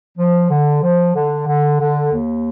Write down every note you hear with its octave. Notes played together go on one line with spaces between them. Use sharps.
F3
D3
F3
D3
D3
D3
D#2